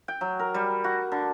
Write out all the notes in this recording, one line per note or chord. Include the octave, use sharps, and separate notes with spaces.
G5
F#3
A#4
G3
F#4
D3